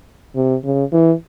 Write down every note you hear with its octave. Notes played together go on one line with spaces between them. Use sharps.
C3
C#3
E3